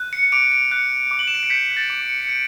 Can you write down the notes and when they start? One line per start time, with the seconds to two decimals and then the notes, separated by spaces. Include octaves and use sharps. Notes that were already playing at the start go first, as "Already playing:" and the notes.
Already playing: F#6
0.13 C#7
0.23 C#7
0.32 D6 D7
0.52 D7
0.71 F#6 C#7
1.11 D6
1.19 F#7
1.28 E7
1.35 D7
1.43 C#7
1.50 G6 B6
1.71 G6
1.76 A6
1.90 D6
2.03 C#7
2.21 C#7
2.29 G6 D7